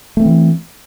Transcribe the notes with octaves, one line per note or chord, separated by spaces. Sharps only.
E3 A3 C4